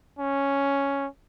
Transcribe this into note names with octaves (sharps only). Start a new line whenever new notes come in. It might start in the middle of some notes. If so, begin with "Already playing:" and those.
C#4